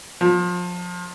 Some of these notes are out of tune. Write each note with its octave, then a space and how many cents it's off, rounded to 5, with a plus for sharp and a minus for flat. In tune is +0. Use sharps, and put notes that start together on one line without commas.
F3 +30